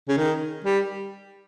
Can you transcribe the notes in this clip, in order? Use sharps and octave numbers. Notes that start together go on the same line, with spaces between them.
C#3
D#3
G3